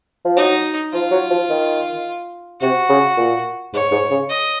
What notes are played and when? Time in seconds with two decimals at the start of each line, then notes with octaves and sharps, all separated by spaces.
0.25 F3
0.37 F#3 D#4
0.93 F3 F4
1.11 F#3
1.30 F3
1.50 D#3
2.61 C3 F#4
2.89 C#3
3.17 A#2
3.73 G#2 C#5
3.92 G#2
4.11 C#3
4.29 D#5